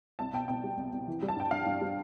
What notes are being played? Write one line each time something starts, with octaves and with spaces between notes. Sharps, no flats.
C2 A5
B2 G5
B2 G5
G3
C2
C2
E3
G3
A5
G2 G5
G2 F5
G2
G3